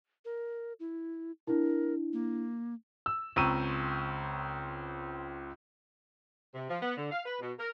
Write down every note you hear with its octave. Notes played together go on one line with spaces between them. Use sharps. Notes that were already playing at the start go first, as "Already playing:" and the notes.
A#4
E4
D4 E4 A#4
A#3
E6
C#2 C4 A#5 C#6 E6 D#7
C3
F3
B3
D3
F5
B4
B2
A#4